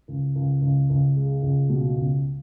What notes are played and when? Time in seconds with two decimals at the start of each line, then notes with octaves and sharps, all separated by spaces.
0.08 C#2
0.36 C#2
0.62 C#2
0.90 C#2
1.16 G#3
1.43 C#2
1.69 B2
1.97 C#2